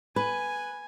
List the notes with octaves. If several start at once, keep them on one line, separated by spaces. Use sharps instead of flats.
B4 G#5